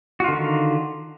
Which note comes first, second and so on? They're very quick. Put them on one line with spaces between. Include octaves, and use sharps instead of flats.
F#4 F4 D3 D#3